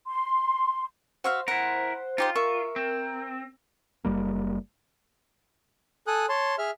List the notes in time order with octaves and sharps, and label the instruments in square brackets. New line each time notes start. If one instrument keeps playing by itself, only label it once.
[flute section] C6
[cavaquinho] F#4 E5 F5 [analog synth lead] C5
[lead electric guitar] E4 A#4 [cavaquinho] F#5
[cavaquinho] D#4 G4 C6 [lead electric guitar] F4
[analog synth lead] A#4 [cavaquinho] E5 C#6
[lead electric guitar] C4
[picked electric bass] F#1 E2 G3 A#3
[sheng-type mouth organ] A4 G#5 D#6 F#6
C#5 A5 C6
G#4 E5 F6